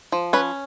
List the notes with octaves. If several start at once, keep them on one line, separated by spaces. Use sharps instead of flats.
F3
C#4 B4